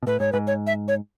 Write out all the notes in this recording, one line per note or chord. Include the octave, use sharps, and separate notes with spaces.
B2
A2 B4
G#2 C#5
G#2 B4
C#5
E5
C#5